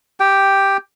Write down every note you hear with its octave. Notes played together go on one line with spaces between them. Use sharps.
G4 G5